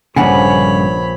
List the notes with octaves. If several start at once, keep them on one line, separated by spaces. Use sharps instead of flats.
A#1 G2 C#3 D4 C#5 F#5 G#5 B5